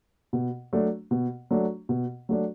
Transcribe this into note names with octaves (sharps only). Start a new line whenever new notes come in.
B2
F#3 A3 D4
B2
F#3 A3 D4
B2
F#3 A3 D4